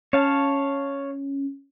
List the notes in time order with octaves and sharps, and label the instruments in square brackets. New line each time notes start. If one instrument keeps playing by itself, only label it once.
[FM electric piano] C#4 [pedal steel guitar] C#5 F5 A5